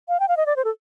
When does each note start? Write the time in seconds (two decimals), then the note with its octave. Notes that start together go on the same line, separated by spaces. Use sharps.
0.09 F5
0.20 G5
0.28 F5
0.37 D#5
0.46 D5
0.56 C5
0.65 A4